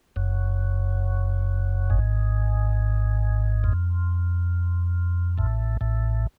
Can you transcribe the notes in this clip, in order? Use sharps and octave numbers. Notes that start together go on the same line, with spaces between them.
F#1 F#2
G#1 G#2
F2
A1 A2
A1 A2